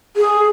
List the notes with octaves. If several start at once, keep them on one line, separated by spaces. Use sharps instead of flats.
G#4